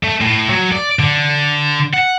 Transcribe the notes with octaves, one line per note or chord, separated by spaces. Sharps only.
A3
A2
F#3
D5
D3
F#5